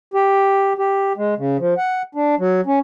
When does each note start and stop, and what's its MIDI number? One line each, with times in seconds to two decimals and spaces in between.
0.14 0.73 67
0.78 1.13 67
1.17 1.34 56
1.38 1.57 49
1.59 1.74 53
1.77 2.02 78
2.15 2.35 62
2.39 2.61 54
2.66 2.79 61